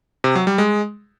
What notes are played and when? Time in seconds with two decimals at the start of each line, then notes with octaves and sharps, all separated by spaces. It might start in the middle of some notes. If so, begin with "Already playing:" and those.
0.24 C3
0.35 F#3
0.47 G3
0.58 G#3